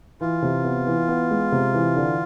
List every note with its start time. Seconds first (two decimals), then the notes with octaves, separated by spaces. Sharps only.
0.21 E3 F4
0.42 C3
0.64 B3
0.87 E3
1.08 B3
1.31 G#3
1.52 C3
1.74 E3
1.96 D3